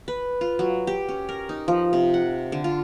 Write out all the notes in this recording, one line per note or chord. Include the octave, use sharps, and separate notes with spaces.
B4
F4
F#3
G4
C#4
A#4
D#4
F3
C3
F#5
D3
F4